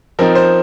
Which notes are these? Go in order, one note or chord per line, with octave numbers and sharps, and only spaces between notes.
F3 C4 D#4 A#4
C5